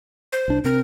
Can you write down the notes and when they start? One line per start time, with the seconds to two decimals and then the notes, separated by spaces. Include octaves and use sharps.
0.32 C5
0.48 C2 D4
0.64 C3 C4 A#4